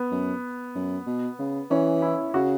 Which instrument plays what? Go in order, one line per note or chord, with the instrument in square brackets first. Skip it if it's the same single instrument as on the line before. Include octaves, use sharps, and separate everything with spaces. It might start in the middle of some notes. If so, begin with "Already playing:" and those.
Already playing: [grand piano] B3
[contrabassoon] F#2
F#2
B2
C#3
[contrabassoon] E3 [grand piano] C#4
[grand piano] E4
[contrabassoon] C#3 [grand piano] F#4